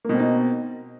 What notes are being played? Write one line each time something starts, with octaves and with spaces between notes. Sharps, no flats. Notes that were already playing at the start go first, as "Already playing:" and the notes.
B2 A#3 C4 D#4